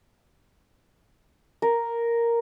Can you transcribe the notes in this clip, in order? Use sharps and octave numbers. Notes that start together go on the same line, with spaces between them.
A#4